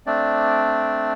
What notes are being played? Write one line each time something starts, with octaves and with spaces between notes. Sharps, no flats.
A3 C4 D4 D5